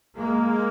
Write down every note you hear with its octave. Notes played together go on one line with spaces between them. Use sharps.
G#3 A#3